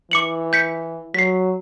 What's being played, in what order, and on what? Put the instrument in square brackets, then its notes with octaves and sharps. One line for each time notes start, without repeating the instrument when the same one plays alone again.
[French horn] E3 [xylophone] D6 C#7 F#7
[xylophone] G6 B6 C#7
[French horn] F#3 [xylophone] B6 C7